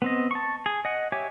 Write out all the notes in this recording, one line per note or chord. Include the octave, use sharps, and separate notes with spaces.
B3 C4 D#5
A5 C#6
G#4
D#5 F#5
G4 C#5 E5 G#5 D6